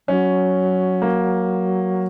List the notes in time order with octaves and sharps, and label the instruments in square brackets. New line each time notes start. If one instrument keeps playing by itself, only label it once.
[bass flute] F#3 [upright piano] C#4
[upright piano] A#3